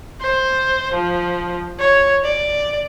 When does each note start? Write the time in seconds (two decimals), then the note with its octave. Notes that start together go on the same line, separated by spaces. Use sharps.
0.21 C5
0.94 F3
1.79 C#5
2.24 D5